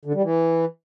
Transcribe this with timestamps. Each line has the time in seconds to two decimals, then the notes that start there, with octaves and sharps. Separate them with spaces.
0.05 D3
0.14 G3
0.23 E3